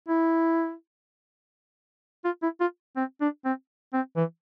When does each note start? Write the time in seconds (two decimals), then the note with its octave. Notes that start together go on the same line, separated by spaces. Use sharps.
0.08 E4
2.24 F4
2.42 E4
2.60 F4
2.96 C4
3.21 D4
3.45 C4
3.93 C4
4.16 E3